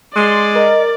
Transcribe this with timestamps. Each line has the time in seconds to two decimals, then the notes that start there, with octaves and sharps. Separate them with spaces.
0.15 G#3 D5 C6
0.55 A#4 D#5